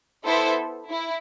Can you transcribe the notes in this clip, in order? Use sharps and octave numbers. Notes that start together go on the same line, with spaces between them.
B3 E4 A4 C5 E5
E4